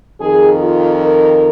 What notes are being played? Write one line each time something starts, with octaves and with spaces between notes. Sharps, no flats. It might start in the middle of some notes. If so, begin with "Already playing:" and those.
F2 D#3 G#4
F4
A#4